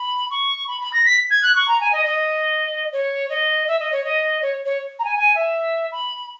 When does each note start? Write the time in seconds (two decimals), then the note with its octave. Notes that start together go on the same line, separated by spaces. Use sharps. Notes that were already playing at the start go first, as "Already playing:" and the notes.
Already playing: B5
0.30 C#6
0.67 B5
0.80 B5
0.93 A#6
1.05 B6
1.30 G#6
1.42 F#6
1.55 C#6
1.68 A#5
1.80 G#5
1.92 D#5
2.05 D#5
2.92 C#5
3.29 D#5
3.67 E5
3.79 D#5
3.92 C#5
4.04 D#5
4.42 C#5
4.65 C#5
4.99 A#5
5.04 G#5
5.16 G#5
5.35 E5
5.92 B5